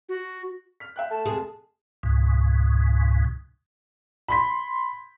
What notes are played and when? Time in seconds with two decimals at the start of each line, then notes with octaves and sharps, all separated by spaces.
0.09 F#4
0.80 F6 B6
0.96 E5 G5 F#6
1.11 A3 A5
1.26 F1 G#4 G#5
2.03 C#2 G#2 B2
4.28 B5 C6 B6